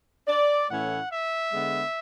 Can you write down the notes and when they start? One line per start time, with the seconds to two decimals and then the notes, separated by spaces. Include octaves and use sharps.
0.28 D5
0.70 A2 E3 A3 C#4 E4 F#5
1.12 E5
1.53 D3 G#3 B3